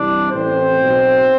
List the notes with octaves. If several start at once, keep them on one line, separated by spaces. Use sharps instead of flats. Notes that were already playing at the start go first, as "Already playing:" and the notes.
Already playing: C2 C3 E3 D4 D5
A1 A2 E3 C4 C5
B1 B2